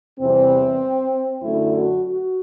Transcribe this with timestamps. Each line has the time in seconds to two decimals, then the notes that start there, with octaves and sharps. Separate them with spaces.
0.19 E2 C3 E3 G3 C4
1.43 F#2 D3 A3 E4
1.74 F#4
2.05 F#4